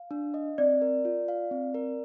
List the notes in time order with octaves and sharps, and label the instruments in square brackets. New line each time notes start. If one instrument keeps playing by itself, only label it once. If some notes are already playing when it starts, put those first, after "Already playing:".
Already playing: [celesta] F5
[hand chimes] D4
D#5
[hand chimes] C4 [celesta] D5
[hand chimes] A#4
F4
F5
C4
A#4